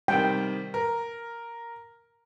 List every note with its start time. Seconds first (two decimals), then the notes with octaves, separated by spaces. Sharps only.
0.08 C3 D#3 G3 G5
0.74 A#4